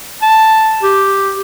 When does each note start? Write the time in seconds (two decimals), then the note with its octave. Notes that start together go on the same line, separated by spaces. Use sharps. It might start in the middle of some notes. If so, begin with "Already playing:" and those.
0.22 A5
0.83 G4